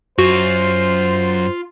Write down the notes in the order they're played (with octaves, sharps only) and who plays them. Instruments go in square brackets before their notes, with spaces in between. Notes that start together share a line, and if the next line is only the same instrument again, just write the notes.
[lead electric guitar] F#2 [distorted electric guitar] F4 [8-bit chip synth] F#4 [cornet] C5